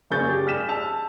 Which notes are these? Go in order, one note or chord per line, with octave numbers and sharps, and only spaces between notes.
F#1 A#3 G#4 C#6 G6 A6
G4
G#4 F6 B6 E7
A5 E6 F7